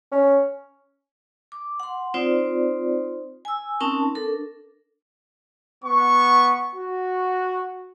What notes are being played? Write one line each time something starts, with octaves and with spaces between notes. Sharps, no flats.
C#4
D6
F#5 C6
C4 D#4 F4 C5 D5
G#5 E6
C4 C#4 D#4 A#4 A5 C#6
D4 A4 A#4
B3 C#6
F#4